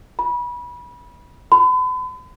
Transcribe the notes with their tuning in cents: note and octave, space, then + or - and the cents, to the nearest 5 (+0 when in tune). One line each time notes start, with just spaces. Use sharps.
B5 -25
B5 +40